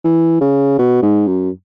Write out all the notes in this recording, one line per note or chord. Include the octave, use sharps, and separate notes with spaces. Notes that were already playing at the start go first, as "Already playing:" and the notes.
E3
C#3
B2
G#2
F#2